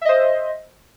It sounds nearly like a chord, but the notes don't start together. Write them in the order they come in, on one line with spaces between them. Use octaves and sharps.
E5 D#5 C5